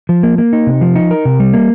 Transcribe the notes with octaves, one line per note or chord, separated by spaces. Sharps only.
F3
A#3
A#3
D#4
C3
F3
D#4
A#4
C3
G3
A#3